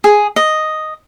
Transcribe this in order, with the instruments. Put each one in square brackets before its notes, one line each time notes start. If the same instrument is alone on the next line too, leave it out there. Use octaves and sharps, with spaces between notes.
[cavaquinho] G#4
D#5